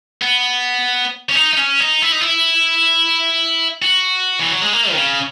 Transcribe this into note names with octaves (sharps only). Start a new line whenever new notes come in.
B3
C#4
D#4
D#4
C#4
D#4
E4
D#4
E4
F#4
E3
F#3
G#3
A#3
D#3
C#3